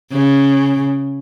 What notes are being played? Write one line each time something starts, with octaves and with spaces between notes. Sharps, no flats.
C#3